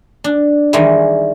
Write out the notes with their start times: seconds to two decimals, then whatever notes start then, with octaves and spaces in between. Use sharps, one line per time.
0.24 D4
0.73 D#3 E3 G3 G#3 E4